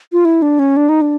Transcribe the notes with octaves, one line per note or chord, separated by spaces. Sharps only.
F4
E4
D4
C#4
D4
D#4
D4